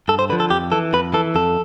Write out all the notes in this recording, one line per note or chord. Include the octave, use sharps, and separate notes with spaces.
G2 A4
C5
D3 F3 B4
A4
F2 G4
E3 A4
F2 B4
E3 A4
F2 A4